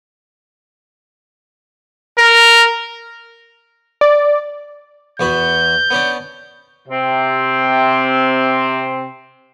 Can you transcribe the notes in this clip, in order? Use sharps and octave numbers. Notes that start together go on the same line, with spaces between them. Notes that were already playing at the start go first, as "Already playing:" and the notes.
A#4
D5
E2 B3 F#4 G6
B3 C#4 D4
C3 C4